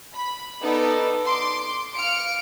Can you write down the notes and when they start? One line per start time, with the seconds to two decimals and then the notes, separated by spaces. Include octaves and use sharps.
0.13 B5
0.62 B3 D#4 A4 D5
1.24 C6 D6
1.96 F5 F6 C#7 D7